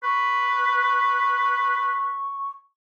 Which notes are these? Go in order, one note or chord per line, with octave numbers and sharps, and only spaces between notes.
B4 C#6